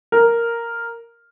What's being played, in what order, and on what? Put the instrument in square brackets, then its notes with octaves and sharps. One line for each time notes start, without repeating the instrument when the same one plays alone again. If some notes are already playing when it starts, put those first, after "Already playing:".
[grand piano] A#4